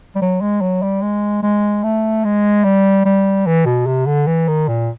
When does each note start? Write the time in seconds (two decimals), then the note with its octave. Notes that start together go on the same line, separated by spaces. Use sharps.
0.16 G3
0.22 F#3
0.41 G#3
0.61 F#3
0.82 G3
1.02 G#3
1.43 G#3
1.84 A3
2.25 G#3
2.64 G3
3.06 G3
3.47 E3
3.66 B2
3.87 C3
4.06 D3
4.27 E3
4.48 D#3
4.68 A#2